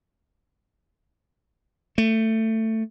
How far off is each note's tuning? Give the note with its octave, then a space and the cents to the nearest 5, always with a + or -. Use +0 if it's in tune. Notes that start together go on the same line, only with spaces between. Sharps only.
A3 +15